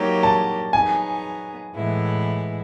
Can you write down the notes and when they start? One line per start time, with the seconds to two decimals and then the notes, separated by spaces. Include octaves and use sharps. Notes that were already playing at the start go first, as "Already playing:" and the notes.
Already playing: F#3 A#3 D#4 G4
0.23 A5
0.73 F#3 B3 D#4 G#4 G#5
1.74 A2 E3 G#3 B3 E4